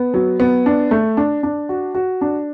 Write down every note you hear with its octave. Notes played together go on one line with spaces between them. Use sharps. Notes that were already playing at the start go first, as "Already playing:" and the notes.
Already playing: B3
F#3
B3
D4
A3
D4
D4
F#4
F#4
D4